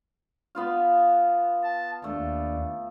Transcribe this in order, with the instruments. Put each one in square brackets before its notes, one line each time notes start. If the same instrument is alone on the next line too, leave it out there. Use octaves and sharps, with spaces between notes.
[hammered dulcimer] B3 F4 F5
[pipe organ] A5
[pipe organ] D#2 D4 [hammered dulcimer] A3